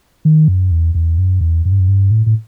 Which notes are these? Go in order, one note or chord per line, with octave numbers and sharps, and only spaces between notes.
D#3
F#2
E2
E2
F#2
E2
F#2
G2
F#2
G2
A2
A2